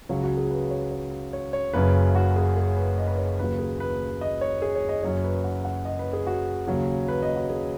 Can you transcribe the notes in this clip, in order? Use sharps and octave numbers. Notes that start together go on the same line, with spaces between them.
C#2 C#3 F#3 C#5
F#4
G#4
B4
C#5
C#5
C#5
C#5
F#1 F#2 C#3 F#3 B4
F#4
G#4
G#4
B4
D#5
B4
C#5
D#2 C#3 F#3 B4
G#4
B4
D#5
C#5
G#4
C#5
D#5
F#1 F#2 F#3 C#5
B4
F#4
F#5
D#5
B4
G#4
F#4
D#2 C#3 F#3
B4
D#5
F#4
G#4